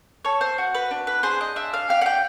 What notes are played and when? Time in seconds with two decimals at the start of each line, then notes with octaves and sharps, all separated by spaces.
0.25 A4 C#5
0.41 C5
0.58 F#4
0.75 B4
0.91 D4
1.07 B4
1.23 G#4 C5
1.41 D#5
1.56 D4 E5
1.74 F5
1.89 G4 F5
2.01 F#5
2.06 G5